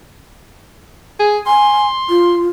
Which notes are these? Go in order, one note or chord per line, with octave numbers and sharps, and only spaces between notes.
G#4
G#5 C6
F4